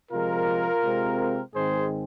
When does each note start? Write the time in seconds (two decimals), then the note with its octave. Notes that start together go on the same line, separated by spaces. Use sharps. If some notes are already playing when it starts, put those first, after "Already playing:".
0.12 C3 F3 G#3 F4 A#4
0.84 C3 G#3 C4
1.55 G#2 D#3 G#3 C4 G#4 C5